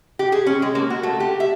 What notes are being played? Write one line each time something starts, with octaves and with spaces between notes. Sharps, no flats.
G4
G#4
C#4
G#3
A#3
F#4
A3
G4
E5